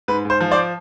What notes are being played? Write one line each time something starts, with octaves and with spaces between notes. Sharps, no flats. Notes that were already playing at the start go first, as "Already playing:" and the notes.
G#2 B4
G#2
C5
F3
C5 D5